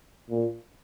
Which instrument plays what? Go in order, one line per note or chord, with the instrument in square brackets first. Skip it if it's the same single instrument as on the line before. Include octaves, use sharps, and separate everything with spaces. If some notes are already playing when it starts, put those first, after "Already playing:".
[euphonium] A#2